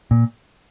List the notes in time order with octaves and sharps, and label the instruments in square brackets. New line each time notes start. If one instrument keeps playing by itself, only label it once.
[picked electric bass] A#2